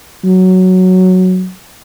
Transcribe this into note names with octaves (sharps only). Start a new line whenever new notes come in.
F#3